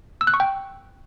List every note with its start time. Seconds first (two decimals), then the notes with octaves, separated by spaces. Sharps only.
0.21 E6
0.27 F#6
0.34 C#6
0.40 G5